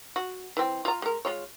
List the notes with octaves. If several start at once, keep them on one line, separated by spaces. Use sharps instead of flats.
F#4
E3 C4
F4 A#5
G#3 A#4
G#3 F4 C#5